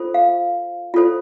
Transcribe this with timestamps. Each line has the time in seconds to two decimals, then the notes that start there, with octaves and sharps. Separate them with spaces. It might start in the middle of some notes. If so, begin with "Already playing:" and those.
Already playing: F4 A4 C5
0.14 F5
0.94 F4 A4 C5